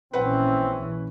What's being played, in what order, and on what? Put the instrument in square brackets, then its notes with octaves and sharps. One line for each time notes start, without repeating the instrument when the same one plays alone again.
[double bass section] A#1 E3 C#4 [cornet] C4 [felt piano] B4 F#5